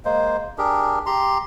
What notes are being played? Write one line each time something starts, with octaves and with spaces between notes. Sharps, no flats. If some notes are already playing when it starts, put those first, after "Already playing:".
G#3 A#3 C5
D4 G4 G#4 A#4
G4 A#5 C6